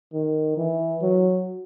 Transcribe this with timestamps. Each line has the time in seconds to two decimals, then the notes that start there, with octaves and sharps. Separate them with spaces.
0.13 D#3
0.57 E3
1.02 F#3